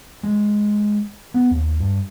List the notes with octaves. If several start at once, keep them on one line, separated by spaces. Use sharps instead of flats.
G#3
B3
D#2
G2